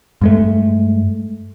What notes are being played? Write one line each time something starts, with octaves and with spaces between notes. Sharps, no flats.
G2 G#3 A3